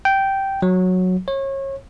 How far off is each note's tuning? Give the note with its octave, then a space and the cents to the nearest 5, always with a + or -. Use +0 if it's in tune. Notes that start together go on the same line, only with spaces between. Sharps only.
G5 -10
F#3 -10
C#5 -30